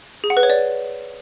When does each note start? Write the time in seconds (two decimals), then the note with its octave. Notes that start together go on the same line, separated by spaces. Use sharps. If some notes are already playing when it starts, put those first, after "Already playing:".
0.24 G#4
0.30 F#5
0.37 B4
0.43 C#5
0.50 D5